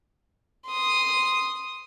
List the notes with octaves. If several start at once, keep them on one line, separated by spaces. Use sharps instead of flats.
C6 D#6